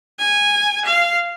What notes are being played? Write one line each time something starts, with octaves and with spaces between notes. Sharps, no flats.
G#5
F5